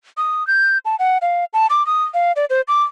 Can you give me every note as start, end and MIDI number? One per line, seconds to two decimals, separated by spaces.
0.17 0.46 87
0.47 0.78 91
0.85 0.96 81
0.99 1.18 78
1.22 1.45 77
1.53 1.67 81
1.70 1.85 86
1.87 2.04 87
2.14 2.32 77
2.36 2.45 74
2.50 2.61 72
2.68 2.83 86